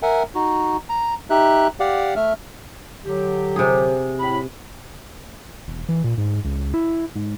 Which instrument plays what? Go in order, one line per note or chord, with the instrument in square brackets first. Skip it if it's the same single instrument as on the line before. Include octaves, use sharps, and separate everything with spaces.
[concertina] A#4 E5 F#5 G#5
D#4 F#4
A#5
D#4 G4 E5 F#6
G4 D5 F5 F#5
A3 E5 F6
[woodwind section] D3 F#3 G4
[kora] C3 G#4
[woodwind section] A2 B5
[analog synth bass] E1
E3
A#2
G#2
C#2
E4
G#2